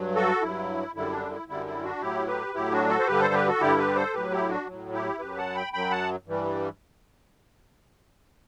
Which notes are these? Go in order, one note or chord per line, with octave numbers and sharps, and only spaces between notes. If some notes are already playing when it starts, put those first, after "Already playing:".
Already playing: G2 F#3
F#4 A4
G2 F#3 E4
F#2 D3 G3 E4
D4
E4
F#2 D3 G3 E4
E4
D4 F#4
A2 F#3 E4 G4
G4 B4
A2 F#3 E4 G4
D4 F#4
F#4 A4
C5
G2 D3 G3 G4 B4
A4 C5
G4 B4
F#4 A4
G2 D3 G3 E4 G4
G4 B4
A4 C5
A2 F#3 G4 B4
E4 G4
D4 F#4
A2 F#3
E4 G4
F#2 F#3 G4 B4
F#5 A5
G5 B5
F#2 F#3 G5 B5
F#5 A5
G2 E3 G3